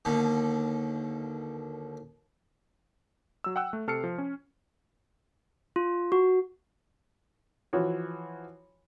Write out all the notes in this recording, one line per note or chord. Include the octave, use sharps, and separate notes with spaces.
D#2 B2 D3
F#3 E6
F#5 G5 E6 F#6
A3
C3 A4 F6 C7 C#7
F3
C#4
F4
F#4
E3 F3 F#4 C#5